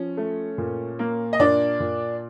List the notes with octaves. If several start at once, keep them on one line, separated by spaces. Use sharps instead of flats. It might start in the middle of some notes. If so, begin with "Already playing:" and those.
Already playing: F3 C#4
A3
A#2
A#3
D#5
A#2 D4 D5
A#2